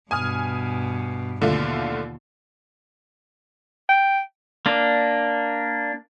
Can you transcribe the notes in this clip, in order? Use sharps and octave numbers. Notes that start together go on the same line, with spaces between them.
G2 B2 G#5 D#6 F6
D#2 B2 D3 A3 F4
G5
A#3 D4